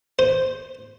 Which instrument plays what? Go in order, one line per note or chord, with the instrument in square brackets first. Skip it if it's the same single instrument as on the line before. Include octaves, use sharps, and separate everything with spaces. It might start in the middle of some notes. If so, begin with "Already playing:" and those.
[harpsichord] C5